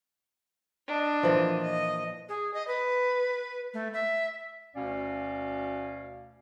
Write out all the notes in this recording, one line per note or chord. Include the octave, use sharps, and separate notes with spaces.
D4 D#5
A#2 E3 F3
D#5
G#4
D#5
B4
A3
E5
D2 B2 C#4 D5 F5